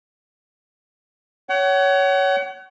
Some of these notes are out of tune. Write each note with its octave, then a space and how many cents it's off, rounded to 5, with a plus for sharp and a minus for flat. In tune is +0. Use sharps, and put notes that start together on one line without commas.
C#5 +15 F#5 +40